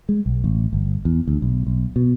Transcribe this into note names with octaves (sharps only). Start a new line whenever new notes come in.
G#3
B1
A1
G1
E2
D2
B1
B1
B2